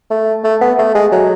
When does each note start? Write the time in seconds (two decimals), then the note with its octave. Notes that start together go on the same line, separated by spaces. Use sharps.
0.10 A3
0.44 A3
0.61 B3
0.79 A3
0.95 G#3
1.12 F#3